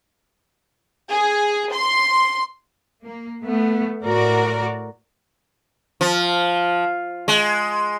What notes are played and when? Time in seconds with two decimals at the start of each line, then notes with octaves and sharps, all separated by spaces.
1.09 G#4
1.73 C6
3.04 A#3
3.41 A3 B3
4.03 A2 F#4 A#4 D5
6.01 F3
7.28 G#3